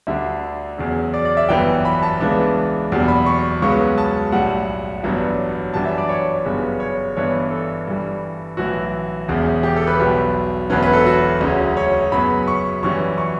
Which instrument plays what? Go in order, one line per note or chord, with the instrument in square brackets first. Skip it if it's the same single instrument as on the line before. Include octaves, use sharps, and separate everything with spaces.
[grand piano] D2 D3 G3 D4 E5
E2 C#3 F#3
D5
D5
E5
G1 F#2 E3 G3 B3 G5
B5
A5
C#2 C#3 E3 B3 D4
F#1 E2 B2 G3
B5
C#6
C#2 C#3 F#3 B3 C#6
A5
B1 A2 G3 F#5
A1 G2 F#3 B3 D4
F#2 E3 G3 D4 A5
E5
D5
C#5
G1 F#2 C#3 G3 B3
C#5
G1 G2 E3 B3 D4 C#5
A4
G2 E3 G3
B1 A2 E3 F#4
E1 E2 C#3
G4
A4
B4
B1 B2 G3
E1 E2 D3 F#3 C#4 B4
B4
A4
F#4
D2 C#3 F#3 C#4
C#5
F#2 C#3 F#3 B3 B5
C#6
F#2 E3 G3 C#4 C#6
C#6